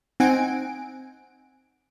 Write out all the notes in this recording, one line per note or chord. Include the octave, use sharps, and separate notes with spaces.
C4 D#4 F#5 G#5 D7